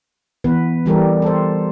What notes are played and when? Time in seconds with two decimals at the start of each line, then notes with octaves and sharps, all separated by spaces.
0.44 E3 B3 B4
0.86 E3 G3 G4 A4 A#4
1.22 A4 C5